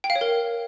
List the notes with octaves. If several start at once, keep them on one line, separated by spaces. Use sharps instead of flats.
G5
F5
C#5
A#4